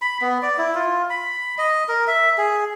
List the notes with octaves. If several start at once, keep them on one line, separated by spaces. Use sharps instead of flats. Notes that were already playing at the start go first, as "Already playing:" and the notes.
B5
B3
D5
E4
F4
B5
D#5
A#4
E5
G#4